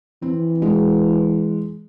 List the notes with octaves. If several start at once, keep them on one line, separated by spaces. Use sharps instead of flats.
E3 C4
G#3